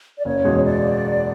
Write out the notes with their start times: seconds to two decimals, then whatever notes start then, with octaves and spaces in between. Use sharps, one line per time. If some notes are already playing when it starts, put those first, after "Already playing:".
0.18 D5
0.25 F#1 C#5
0.45 E2 B2 G#3
0.65 D5